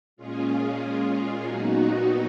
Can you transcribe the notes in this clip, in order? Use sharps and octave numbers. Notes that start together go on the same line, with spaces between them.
A#2 G#3 C#4 F4 G#4
A#2 F#3 B3 D#4 F#4